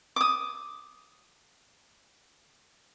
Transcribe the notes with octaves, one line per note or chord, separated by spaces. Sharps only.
D6 D#6